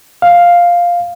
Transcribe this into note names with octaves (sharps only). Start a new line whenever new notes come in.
F5